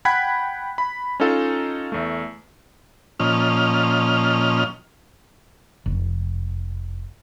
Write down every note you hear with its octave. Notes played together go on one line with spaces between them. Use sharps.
F#5 G5 B5 F#6 G#6 B6
B5
C#4 D#4 F4 A4 F5
E2 A3
A#2 F3 C#4 D#5 F6
F1